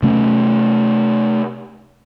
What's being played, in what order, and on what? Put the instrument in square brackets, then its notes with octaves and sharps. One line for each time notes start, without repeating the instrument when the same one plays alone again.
[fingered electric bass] C3 A3 C#4